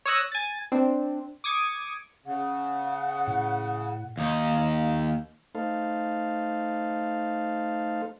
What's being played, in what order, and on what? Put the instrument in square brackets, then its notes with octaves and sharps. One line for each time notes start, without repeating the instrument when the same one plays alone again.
[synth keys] C#5 C#6 D#6 E6 F#6 A#6
G#5 A6
C4 D4
D6 D#6 G#6 C#7
[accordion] C#3 [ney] F#5
[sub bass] A2
[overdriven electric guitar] D#2 D#4
[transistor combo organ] A3 D#4 A4 C5 F5